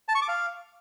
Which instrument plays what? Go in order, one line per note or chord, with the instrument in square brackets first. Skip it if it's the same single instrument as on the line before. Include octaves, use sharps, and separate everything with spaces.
[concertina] A5
C#6
D6
F5